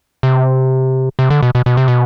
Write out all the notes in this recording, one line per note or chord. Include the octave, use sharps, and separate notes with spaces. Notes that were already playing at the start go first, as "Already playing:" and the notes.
C3
C3
D3
B2
B2
B2
C3
B2